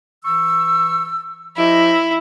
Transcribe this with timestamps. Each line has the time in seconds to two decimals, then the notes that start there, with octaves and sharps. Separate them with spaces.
0.24 E3 C#6 E6
1.57 F3 E4 G4 D#5